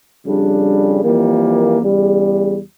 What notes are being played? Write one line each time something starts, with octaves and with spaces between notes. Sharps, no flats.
F2 C#3 G3 D4
F2 E3 G3 A#3
E2 C#3 G3